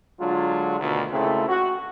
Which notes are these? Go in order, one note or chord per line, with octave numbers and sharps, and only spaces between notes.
D3 F#3 G#3 D4 F4
D2 B2 D#3
C#2 A#2 C#3 A3 C4 E4
F#4